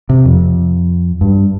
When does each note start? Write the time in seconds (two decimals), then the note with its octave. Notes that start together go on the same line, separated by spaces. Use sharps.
0.09 C3
0.25 F2
1.21 G2